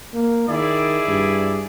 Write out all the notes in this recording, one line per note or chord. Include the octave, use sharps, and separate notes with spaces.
A#3
D#3 E4 G#4 D5
G2